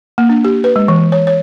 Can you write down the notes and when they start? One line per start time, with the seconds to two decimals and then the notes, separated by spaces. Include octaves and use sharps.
0.18 A#3
0.29 D4
0.45 G4
0.64 B4
0.76 G#3
0.88 E3
1.12 C#5
1.27 C#5